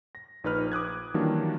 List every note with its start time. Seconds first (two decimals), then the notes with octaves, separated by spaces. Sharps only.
0.15 A#6
0.44 A#1 D#4 B4 F6
0.72 D6 D#6 F#6 G#6
1.14 D#3 E3 F#3 G3 A#3 D4